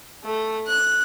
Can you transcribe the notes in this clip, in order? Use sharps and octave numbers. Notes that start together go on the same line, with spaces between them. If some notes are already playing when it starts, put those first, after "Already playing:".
A3
F#6